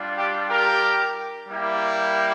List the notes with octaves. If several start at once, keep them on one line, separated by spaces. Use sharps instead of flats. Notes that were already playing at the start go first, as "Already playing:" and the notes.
Already playing: G3 D4 F4
G4
G4 A#4
G3 A#3 E4 G4